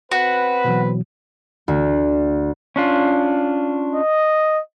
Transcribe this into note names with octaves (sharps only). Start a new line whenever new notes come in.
C4 F#4 B4
B2 E3 F#3
D2
C#4 D4 F4
D#5